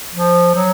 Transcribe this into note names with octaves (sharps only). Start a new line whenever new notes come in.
F3
F#3